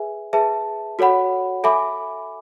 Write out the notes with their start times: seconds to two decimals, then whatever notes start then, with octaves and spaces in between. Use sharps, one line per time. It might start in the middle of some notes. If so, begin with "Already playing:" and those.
Already playing: G#4 B4 E5 G#5
0.33 G#4 B4 E5 A5
0.99 F#4 A4 C#5 F#5 B5
1.64 A4 E5 G#5 B5 D6